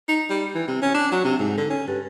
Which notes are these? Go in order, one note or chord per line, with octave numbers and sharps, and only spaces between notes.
D#4
G3
E3
C3
C#4
D4
F#3
C3
G#2
D3
C#4
G2